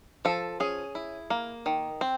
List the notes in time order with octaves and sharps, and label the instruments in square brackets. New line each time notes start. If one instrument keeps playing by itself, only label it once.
[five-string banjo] F3 A4
C#4 G#4
E4
A#3
D#3
C4